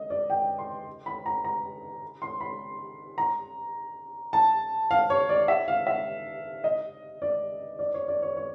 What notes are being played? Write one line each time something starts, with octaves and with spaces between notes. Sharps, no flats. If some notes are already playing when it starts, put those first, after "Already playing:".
Already playing: D#5
D5
G5
C6
B5
A#5
A#5
C6
B5
A#5
A5
F5
C#5
D5
E5
F5
E5
D#5
D5
D5
C#5
D5
C#5
C#5